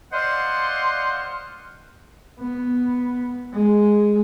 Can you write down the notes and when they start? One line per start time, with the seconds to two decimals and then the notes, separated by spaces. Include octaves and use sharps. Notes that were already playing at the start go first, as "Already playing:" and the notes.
0.13 C5 D5 D#5 F5 F#5 C6
2.39 B3
3.54 G#3